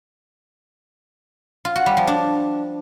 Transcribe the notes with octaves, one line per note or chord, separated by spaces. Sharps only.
F4
F#4
G3
F3
D4